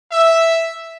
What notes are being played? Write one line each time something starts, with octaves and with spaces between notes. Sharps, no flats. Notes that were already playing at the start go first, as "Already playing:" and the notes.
E5